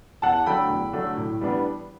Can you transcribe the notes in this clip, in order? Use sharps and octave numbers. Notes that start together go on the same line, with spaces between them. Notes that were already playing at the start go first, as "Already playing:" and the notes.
E2 F#5 A5
D3 F#3 A3 D4 G5 B5
E2
D3 F#3 A3 D4
A2
E3 G3 B3 D4